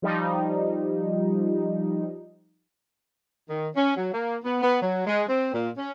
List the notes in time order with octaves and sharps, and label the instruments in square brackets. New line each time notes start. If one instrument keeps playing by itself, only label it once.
[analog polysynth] F3 G3 D#4
[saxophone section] D#3
C#4
F#3
A#3
B3
B3
F#3
G#3
C4
A#2
C#4